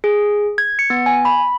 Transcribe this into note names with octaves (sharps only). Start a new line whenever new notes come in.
G#4
G#6
C#7
B3
G#5
B5